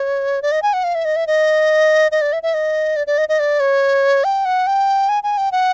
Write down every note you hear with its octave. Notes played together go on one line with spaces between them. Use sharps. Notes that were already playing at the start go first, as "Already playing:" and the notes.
Already playing: C#5
D5
D#5
G#5
F#5
F5
E5
D#5
E5
D#5
D#5
D5
E5
E5
D#5
D5
D5
D#5
D#5
D5
C#5
G5
F#5
G5
G#5
G#5
G5
F#5